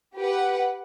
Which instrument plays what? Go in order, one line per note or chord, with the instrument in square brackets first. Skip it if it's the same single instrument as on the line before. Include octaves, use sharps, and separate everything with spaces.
[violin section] G4 B4 F#5